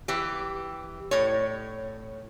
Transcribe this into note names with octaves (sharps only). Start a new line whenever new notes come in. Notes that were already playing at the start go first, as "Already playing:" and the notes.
E3 G4
A2 C#5